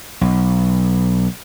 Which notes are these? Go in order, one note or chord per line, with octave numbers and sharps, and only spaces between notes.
B1